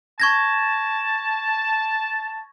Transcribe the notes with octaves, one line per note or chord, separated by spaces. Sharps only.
A5 C#6 G#6 A#6